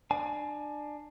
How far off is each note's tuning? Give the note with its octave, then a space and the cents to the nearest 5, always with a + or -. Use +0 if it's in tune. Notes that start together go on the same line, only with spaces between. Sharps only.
D4 +25 G#5 +30